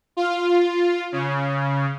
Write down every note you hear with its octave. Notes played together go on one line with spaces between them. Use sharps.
F4
C#3